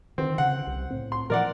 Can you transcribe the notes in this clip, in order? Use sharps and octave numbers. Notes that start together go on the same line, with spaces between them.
D3 D#3 C4
C#3 F#5
C2
A2 C4
C6
A#2 E3 F3 A#4 D5 F#5